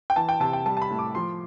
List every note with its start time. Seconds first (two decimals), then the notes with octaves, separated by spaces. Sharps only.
0.10 G5
0.16 E3 A5
0.29 G5
0.40 C3 A5
0.53 G5
0.66 G3 A5
0.77 A5
0.82 B5
0.90 A2
0.99 D6
1.15 F3 C6